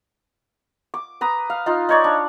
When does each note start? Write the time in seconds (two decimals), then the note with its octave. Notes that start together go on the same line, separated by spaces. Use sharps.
0.94 D6
1.21 B4 A#5 D#6
1.50 F5
1.66 D#4 F4
1.89 D#4 C#5 D5
2.04 D4